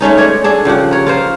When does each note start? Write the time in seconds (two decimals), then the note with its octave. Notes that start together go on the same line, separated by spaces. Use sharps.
0.01 G#3 A3 C#4 D#4
0.18 G#4 C#5 D5
0.44 D4 G#4 A4
0.65 C#3 F3 G4 F#5
0.91 A#4 C#5
1.06 F4 A#4 C5